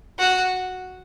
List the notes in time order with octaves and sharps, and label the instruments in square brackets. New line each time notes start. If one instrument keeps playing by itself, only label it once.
[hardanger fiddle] F#4